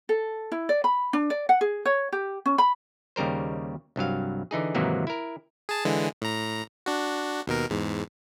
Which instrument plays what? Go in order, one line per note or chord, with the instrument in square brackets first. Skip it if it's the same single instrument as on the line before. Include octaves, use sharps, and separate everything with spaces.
[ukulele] A4
E4
D5
B5
D4
D5
F#5
G#4
C#5
G4
C#4
B5
[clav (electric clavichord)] D#2 C#3 G3 A#4 C5
C2 G2 F#3 F5
D3 E3 D#4 G#4
G#2 C3 D#3 E3 F#3 A#3
E4 A#4
[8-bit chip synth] G#4 A5
D3 E3 G#3
A2 A#5
D4 F#4
D#2 B2 A#4
E2 G#2